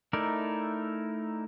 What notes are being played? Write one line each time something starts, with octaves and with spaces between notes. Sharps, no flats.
A3 D#4 E4 A#4 D5